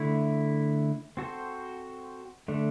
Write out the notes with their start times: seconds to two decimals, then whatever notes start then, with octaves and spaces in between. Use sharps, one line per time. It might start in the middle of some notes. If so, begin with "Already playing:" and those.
Already playing: D3 A3 E4
1.17 C4 F#4 A4 C5
2.48 D3 A3 D4